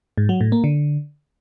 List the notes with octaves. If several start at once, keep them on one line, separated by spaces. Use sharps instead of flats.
G#2
F#3
A2
A#3
D3